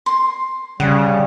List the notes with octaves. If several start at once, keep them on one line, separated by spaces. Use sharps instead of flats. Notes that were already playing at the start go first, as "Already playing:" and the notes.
C6
C#3 G3 F#5